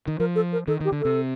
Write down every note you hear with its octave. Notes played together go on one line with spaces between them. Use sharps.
D#3
F3 A#4
A4
A#4
D#3 A4
D#3
G4
D3
C3 A4